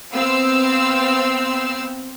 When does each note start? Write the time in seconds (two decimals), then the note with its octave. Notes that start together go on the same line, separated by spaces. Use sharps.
0.14 B3 C4 F5 E6